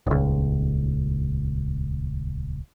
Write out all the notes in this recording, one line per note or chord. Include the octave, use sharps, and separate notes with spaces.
D#1 C#2